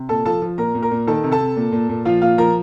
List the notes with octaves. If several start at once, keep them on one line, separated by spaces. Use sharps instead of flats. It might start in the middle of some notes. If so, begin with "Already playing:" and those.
Already playing: C3
A#2 A4 A5
F3 A4 A5
F3
A#2 A#4 A#5
A#2
A#4 A#5
A#2
D#3 A4 A5
C3
A4 A5
C3
A#2
A#2
A#2
F3 F4 F5
A#2 F4 F5
F3 A#4 A#5